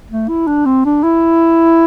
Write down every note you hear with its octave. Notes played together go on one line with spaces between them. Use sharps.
A3
E4
D4
C4
D4
E4